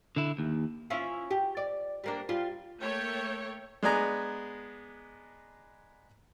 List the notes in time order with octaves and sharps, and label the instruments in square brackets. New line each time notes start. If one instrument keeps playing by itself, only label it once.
[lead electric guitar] D3 E4
D#2
[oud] C#4 E4 F4
G4
D5
G3 A#3 D4
G3 F4
[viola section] A3 A#3 C#5 G5
[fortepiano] G#3 B3 D4 G#5 A#5